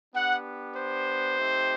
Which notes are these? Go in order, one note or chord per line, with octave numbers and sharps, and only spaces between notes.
B3 D4 G4 F#5
C5
A3 C4 D#4 G4